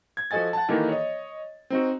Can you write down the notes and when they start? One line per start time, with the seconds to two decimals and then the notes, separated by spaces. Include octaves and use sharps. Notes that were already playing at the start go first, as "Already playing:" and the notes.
0.17 G#6
0.31 F3 F#4 A4 D#5 G#5 A6
0.53 F#5 A5
0.68 D#3 E3 A#3 D#4 G4 A4
0.89 C#5 D#5
1.70 C4 D#4 F#4